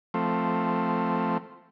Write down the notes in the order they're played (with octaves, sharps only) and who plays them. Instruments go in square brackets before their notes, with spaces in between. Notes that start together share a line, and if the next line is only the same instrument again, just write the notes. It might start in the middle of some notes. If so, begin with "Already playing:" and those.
[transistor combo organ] F3 A3 C4